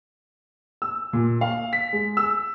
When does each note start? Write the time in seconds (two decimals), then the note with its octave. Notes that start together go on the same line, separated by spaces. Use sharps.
0.82 E6
1.13 A#2
1.41 F5
1.73 B6
1.93 G#3
2.17 E6